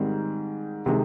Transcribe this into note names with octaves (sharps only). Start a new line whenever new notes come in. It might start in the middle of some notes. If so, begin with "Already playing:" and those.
Already playing: G#2 D#3 G3 C4
C3 D#3 G#3